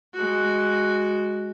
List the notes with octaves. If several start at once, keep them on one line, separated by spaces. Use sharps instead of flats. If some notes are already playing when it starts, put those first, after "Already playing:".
G#3 F#4